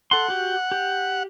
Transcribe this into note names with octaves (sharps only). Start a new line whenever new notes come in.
A4 F#5 C6
F#4 G4
G4